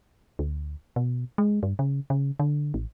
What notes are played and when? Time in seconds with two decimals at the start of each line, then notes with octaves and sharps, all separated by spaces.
0.39 D2
0.96 B2
1.38 G#3
1.63 G2
1.79 C#3
2.10 C#3
2.39 D3
2.74 A1